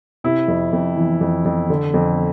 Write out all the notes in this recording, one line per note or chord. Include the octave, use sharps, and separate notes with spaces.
C3 E4
F2
F2
E3
F2
F2
D3
F2